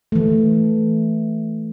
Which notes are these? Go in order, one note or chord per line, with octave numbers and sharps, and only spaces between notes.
E3 A3